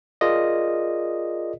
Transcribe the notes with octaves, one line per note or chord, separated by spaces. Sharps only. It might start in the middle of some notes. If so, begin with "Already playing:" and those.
F4 G#4 A#4 D5 D#5